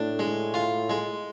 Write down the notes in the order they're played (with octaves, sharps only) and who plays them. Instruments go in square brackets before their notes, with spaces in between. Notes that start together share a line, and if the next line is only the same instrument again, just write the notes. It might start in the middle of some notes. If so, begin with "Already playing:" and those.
Already playing: [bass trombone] A2 [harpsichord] D4
[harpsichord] G#3
F4
G#3